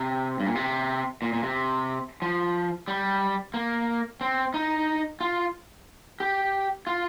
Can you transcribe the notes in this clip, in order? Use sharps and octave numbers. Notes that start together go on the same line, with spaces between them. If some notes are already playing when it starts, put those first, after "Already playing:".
Already playing: C3
G2
A#2
C3
A#2
A#2
C3
F3
G3
A#3
C4
D#4
F4
G4
F4